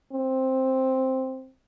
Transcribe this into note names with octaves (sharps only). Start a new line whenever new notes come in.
C4